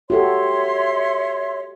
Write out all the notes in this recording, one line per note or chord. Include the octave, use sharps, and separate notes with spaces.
F#4 G4 A4 C#5 E5 C6